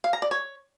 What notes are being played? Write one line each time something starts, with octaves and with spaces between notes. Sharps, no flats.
F5
A#5
D5
C#5